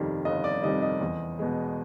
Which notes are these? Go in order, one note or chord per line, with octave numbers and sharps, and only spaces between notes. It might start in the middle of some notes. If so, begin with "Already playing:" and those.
Already playing: G1 F2 C3 D#3 G3
G1 D#5
D5
F2 C3 D#3 G3 D#5
D#5
E2
B2 G#3